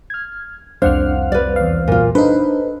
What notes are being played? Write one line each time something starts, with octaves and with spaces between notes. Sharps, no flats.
F6 G#6
C2 F2 D4 C5 F5 F#5 F6
B4 D5
E2 F5
A#2 F4
D4 D#4 A4 B4 C5